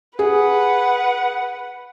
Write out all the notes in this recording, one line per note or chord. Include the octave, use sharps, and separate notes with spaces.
G#4 B4 F#5